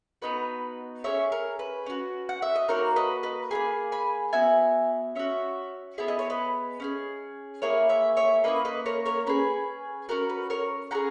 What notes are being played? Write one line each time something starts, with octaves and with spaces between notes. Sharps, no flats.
B3 D#4 F#4 B4 D#5
C#4 G#4 C#5 E5
A#4
B4
C#4 F#4
F#5
E5
D#5
A#3 D#4 F#4 A#4 C#5
B4 D#5
B4 D#5
A#3 E4 G#4 G#5 B5
G#5 B5
B3 F#4 E5 G#5
C#4 F#4 C#5 E5
B3 E4 G#4 E5
D#5
C#5
B4 D#5
C#4 E4 G#4
A#3 E4 G#4 A#4 C#5
C#5 E5
C#5 E5
A#3 C#4 E4 B4 D#5
B4 D#5
A#4 C#5
A#4 C#5
C#4 G#4 B4
C#4 F#4 A#4
B4
A#4 C#5
C#4 E4 G#4 F#5 A#5